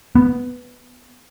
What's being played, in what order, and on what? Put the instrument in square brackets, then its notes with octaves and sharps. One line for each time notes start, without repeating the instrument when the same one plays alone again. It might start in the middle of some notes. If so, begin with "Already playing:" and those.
[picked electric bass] B3